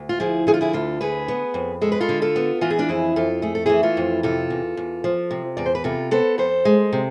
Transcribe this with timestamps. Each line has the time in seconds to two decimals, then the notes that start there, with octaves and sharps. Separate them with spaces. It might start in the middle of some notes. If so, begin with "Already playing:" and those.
Already playing: D2
0.09 F4
0.20 F3 E4 G#4
0.47 D3 G#4
0.54 F4
0.61 E4 G#4
0.73 D2 F4 A4
1.01 D3 G#4 B4
1.28 B3
1.54 F2
1.82 G#3 A4
1.92 B4
2.01 F4 A4
2.09 D3
2.22 F4 A4
2.36 B3
2.61 E3 F4
2.70 G#4
2.79 D4 F4
2.89 F2 E4 G#4
3.16 F2 F4 A4
3.42 A3 G#4
3.55 A4
3.66 E3 E4 G#4
3.83 F4 A4
3.97 F2
4.23 C3 F4 A4
4.50 E2
4.77 E2
5.04 F3
5.31 C3
5.57 E2 D5
5.66 C5
5.75 B4
5.84 C3 F4 A4
6.11 B3 A4 C5
6.38 F2 A4 C5
6.65 G#3
6.93 C3